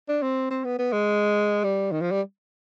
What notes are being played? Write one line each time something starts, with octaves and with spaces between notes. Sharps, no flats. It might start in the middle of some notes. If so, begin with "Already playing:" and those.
D4
C4
C4
B3
B3
G#3
G3
D#3
F3
G3